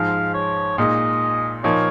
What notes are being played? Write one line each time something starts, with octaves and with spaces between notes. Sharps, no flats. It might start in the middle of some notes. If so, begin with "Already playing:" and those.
Already playing: G#2 F3 G#3 F5
C#5
A#2 G#3 D#4 D#5
A#2 F3 A#3 D#4 C#5